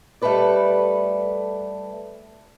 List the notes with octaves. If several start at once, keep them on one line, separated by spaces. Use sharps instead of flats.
G3 A3 A#3 A4 B4 D5